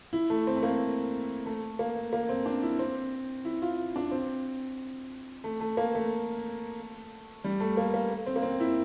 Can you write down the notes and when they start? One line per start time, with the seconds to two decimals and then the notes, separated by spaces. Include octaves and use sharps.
0.13 E4
0.30 A3
0.47 C4
0.56 A3
0.63 A#3
1.46 A3
1.79 A#3
2.13 A#3
2.29 C4
2.46 D4
2.63 E4
2.79 C4
3.45 E4
3.62 F4
3.96 D4
4.11 C4
5.44 A3
5.61 A3
5.77 A#3
5.95 A3
7.44 G3
7.60 A3
7.77 A#3
7.94 A#3
8.26 C4
8.36 A#3
8.43 C4
8.60 E4